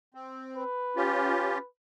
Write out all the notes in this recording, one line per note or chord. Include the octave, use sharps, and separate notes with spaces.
C4
B4
C#4 F4 G4